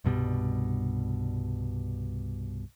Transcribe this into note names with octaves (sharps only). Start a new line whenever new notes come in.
C2 G2 B2 G3